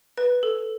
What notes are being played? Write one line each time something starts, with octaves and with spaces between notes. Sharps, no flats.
B4
A4